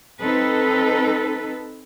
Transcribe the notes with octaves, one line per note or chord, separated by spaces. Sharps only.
C4 D#4 A4 B4